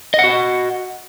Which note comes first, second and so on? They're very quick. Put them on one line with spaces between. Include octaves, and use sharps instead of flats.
D#5 F#5 F#4